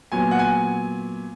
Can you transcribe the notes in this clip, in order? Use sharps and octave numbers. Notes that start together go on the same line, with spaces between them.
A#2 F#3 B3 G#5
F#5
G#5